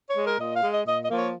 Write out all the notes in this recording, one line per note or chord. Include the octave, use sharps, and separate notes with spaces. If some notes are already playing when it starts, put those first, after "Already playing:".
C#5
G#3
A#4
A#2 D#5
F5
G#3
D#5
A#2 D#5
D#5
F3 A#3
C#5